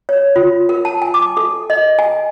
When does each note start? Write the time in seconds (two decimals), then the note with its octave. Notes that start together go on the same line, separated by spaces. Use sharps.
0.09 C#5
0.36 F4
0.69 A#4
0.85 A5
1.02 G#5
1.14 D6
1.37 A4
1.70 D#5
1.99 G#5